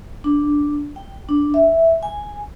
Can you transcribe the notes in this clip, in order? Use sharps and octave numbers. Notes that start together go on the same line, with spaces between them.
D4
G5
D4
E5
G#5